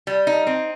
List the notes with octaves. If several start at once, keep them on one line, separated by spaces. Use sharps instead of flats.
G3
D#4
C4